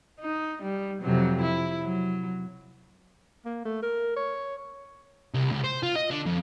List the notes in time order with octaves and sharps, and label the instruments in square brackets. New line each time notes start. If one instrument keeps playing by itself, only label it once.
[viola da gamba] D#4
G3
F2 C3 F#3
E4
F#3
[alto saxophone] A#3
A3
A#4
C#5
[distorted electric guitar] C2
C#2
C5
F4
D#5
D3
F2